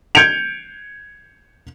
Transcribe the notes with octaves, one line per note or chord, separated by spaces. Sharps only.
G6 G#6 C#7 D7 F7